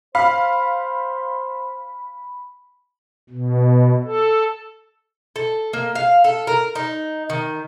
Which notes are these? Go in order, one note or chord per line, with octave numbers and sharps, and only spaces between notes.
C5 F5 B5
B2
A4
A4
A#3
F5
A4
A#4
D#4
D#3